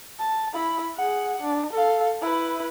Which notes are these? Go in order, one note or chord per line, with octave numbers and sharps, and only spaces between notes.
A5
E4 B5
G#4 F#5
D4
A4 F5
E4 B4